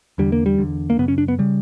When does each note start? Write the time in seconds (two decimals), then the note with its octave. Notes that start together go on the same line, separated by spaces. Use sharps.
0.18 E2 D3 G3
0.32 A#3
0.46 G3
0.58 E2 D3
0.90 A#3
0.99 F#2 C#3 B3
1.08 C#4
1.18 D4
1.28 B3
1.39 C#3 G3